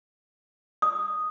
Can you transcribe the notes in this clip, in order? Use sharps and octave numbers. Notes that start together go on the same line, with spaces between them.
D#6